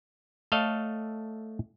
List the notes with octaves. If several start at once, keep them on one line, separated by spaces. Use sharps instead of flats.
A3 A4 C#5 D#5 F5